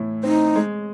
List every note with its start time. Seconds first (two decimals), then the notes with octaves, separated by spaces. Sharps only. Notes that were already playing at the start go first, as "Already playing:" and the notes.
Already playing: A2 E3 E4
0.23 C4 D#4
0.56 G#3